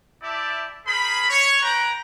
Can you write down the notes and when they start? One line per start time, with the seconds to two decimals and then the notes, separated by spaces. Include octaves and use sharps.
0.23 E4 G4 D5 E5 A5
0.86 G#4 A#4 C5 B5
1.29 C#5
1.62 B4 G5 A#5